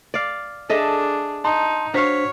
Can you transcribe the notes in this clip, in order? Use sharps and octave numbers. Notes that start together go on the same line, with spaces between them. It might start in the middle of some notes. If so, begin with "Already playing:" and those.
D5 F5
D4 G#4 A4 D#5 E5
D#4 A5 C6
D4 F#4 C5 C#5 F5 B6